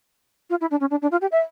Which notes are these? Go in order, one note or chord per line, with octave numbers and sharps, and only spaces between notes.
F4
E4
D4
C#4
D4
D4
F4
G4
E5